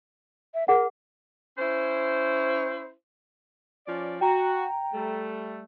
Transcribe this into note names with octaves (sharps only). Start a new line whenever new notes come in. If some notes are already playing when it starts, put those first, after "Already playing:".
E5
G#4 A#4 F#5
C#4 E4 C5
F3 C#4 D5
F#4 G5 A#5
G3 A3